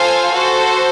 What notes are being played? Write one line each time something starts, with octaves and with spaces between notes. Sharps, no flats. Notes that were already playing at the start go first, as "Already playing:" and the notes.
Already playing: F4 A4 C5 F5 G#5
F#4 A4 C5